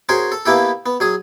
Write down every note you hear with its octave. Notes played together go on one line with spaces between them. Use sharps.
C#4 F#4 G#4 A#4 C5
A4
A#3 B3 E4 G4 A4
B3
F#3 G#4 D#6